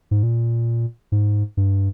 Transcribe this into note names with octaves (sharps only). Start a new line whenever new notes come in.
G#2
A#2
G#2
G2